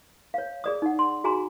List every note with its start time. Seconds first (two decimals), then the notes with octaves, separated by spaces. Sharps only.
0.34 C#5 F5
0.64 G#4 D5 D#6
0.82 D#4 F#5
0.99 C6
1.24 F#4 G#4 G#5 A#5 C6